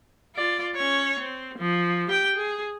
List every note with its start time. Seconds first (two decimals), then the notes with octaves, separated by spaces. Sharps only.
0.35 F4 D5
0.76 C#4 C#5
1.19 C4
1.58 F3
2.07 G4 G5
2.36 G#4